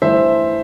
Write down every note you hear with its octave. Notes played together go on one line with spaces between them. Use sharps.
G2 E3 A3 C5 E5